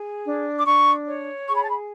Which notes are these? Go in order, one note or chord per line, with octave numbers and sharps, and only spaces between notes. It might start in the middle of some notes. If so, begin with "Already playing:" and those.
Already playing: G#4
D4
D6
D4 C#6
C#5
G#4 C#6
B5
A5
B5